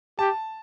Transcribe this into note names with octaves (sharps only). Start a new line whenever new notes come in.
G4 A5